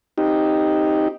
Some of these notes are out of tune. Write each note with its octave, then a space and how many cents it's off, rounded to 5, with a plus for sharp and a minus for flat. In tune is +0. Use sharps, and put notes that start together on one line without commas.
C4 +0 D#4 +0 G4 +0